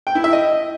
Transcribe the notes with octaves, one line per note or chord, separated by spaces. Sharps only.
G5
E4
E5
D#5